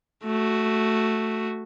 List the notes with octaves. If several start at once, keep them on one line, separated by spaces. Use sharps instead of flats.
A3 F#4